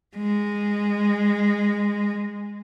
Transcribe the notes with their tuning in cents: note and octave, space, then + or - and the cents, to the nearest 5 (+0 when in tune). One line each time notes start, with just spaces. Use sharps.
G#3 -15